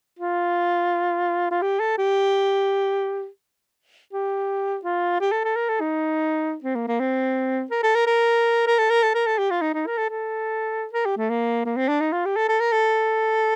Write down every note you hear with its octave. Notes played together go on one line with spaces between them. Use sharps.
F4
F4
G4
A4
G4
G4
F4
G4
A4
A4
A#4
A4
D#4
C4
A#3
A#3
C4
A#4
A4
A#4
A#4
A#4
A4
A#4
A4
A#4
A4
G4
F4
D#4
D#4
A#4
A4
A4
A#4
G4
A3
A#3
A#3
C4
D4
D#4
F4
G4
A4
A4
A#4
A4